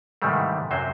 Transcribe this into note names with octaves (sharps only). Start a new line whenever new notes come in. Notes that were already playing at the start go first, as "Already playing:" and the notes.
G#2 C3 D#3 E3 G3 A3
F#2 C3 F#3 C5